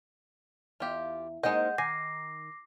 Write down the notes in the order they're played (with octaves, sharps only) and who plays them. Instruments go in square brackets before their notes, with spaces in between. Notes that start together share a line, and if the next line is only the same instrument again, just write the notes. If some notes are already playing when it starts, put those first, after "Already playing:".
[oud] E2 E5 F5 [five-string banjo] F4 G4
[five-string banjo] G#3 D#5 [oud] A#3 C4 D#4 [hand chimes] F#5 G6
[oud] D#3 [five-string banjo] G#5 [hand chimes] D6 A#6 C7